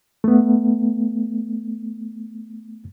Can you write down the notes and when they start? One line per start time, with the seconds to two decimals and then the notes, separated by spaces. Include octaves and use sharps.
0.24 A3 B3